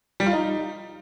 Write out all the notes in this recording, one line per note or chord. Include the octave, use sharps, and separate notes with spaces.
G3
F4
D#4